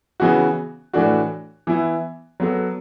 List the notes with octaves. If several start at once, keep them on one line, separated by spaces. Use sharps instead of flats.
C#3 E3 B3 F#4
A2 E3 A3 D4 F#4
E3 B3 E4
F#3 B3 F#4 A4